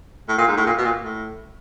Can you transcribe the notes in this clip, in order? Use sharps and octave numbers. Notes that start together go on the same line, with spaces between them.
A2
A#2
G#2
A2
A#2
B2
A#2
A2